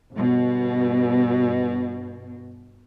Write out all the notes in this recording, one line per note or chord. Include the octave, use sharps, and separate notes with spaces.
G1 B2